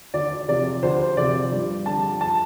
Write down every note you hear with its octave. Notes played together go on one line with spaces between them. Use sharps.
D2 D5
C3 F3 D5
D2 C5
C3 F3 D5
G2
D3 F3 A5
A5